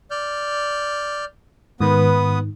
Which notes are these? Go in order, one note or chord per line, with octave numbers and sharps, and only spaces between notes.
D5 F6 G6
G#2 D#3 B3 B4 D#6